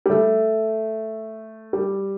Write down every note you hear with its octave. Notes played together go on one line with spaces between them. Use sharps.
G3
A3
G3